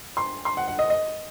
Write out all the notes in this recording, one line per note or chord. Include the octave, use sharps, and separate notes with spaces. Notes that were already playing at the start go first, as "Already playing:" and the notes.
C6
C6
F#5
F#5
D#5
D#5